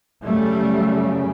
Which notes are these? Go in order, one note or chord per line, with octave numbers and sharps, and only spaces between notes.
F#2 C#3 G3 A3